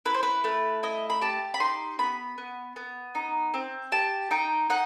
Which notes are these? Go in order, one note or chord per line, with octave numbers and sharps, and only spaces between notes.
E4 B4
C5
B4
A3 B4
E4 D#5
B5
G4 A5
B5
D#4 C6
B3 B5
B3
B3
D#4
C4
G4 A5
D#4 G5
D#4 F#5